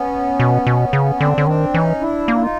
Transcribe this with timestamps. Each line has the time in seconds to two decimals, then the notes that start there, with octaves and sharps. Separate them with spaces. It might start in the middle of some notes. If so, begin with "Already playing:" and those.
Already playing: B3 C#4
0.40 B2
0.67 B2
0.93 C#3
1.20 D3 C4 D4
1.37 D3 C#4
1.47 D#3 C4 D4
1.74 E3 C#4 D#4
2.01 D4 E4
2.28 A#3
2.35 E4
2.42 D#4 F4